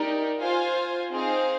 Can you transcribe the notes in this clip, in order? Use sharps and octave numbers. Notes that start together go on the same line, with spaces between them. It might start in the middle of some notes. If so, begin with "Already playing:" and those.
Already playing: D#4 G4 A#4 D5
F4 C5 F5 G#5
C4 D#4 G#4 C5 F5